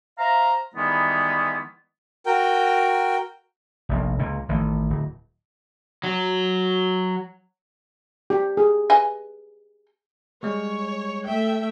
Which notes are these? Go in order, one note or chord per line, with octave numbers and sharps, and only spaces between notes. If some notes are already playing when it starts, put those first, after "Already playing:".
C5 E5 F5 A#5
D#3 E3 G3 G#3 B3 E4
F#4 A#4 G5
F1 A#1 F2
C#2 A#2
A1 A2 D#3
D1
F#3
G4
G#4
B4 D#5 G#5
G3 G#3 C#5
A3 E5 G5